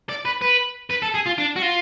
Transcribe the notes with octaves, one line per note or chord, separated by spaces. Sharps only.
D5
B4
B4
B4
A4
G#4
F4
D4
F#4
F4